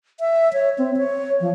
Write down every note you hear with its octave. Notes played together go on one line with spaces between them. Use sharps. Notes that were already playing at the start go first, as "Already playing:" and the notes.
E5
C#5
C4
C#5
F3